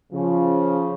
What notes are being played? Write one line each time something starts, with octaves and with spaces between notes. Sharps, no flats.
C#3 F3